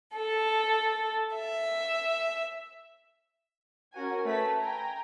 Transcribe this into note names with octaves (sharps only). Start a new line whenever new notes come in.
A4
E5
C#4 F#4 A#4 G#5
A3 B4 B6
G5 G#5 A#5